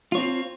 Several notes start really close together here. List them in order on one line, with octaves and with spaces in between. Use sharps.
F4 C#5 C4